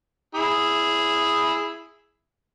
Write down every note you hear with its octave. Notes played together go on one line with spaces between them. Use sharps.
E4 G#4